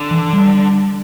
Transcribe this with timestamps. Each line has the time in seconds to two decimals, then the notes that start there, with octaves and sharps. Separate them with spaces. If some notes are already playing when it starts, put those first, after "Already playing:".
Already playing: D3
0.11 E3
0.33 G3